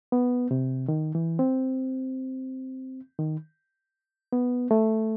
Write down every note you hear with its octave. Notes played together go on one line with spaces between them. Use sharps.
B3
C3
D#3
E3
C4
D#3
B3
A3